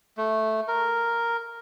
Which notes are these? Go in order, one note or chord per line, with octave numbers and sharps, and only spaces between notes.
A3
A#4